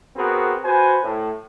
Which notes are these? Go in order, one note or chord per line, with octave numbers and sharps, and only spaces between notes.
B3 C4 F#4 G#4 A#4
F#4 B4 C5 G#5
A2